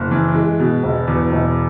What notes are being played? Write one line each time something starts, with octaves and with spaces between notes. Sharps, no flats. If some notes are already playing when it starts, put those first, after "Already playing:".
Already playing: F#1
E3
G#3
B2
E1
E2
E1